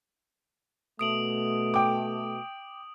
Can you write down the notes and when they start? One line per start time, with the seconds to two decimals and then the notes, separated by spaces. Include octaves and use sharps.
0.99 B2 A3 D#6 D7 F#7
1.74 G5 D6